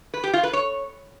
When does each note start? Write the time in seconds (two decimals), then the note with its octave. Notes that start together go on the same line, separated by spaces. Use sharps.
0.14 B4
0.24 G4
0.34 F4
0.43 B4
0.53 C#5